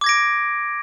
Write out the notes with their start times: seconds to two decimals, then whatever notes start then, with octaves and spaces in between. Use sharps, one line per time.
0.01 D6
0.04 G#6
0.06 A#6
0.09 D7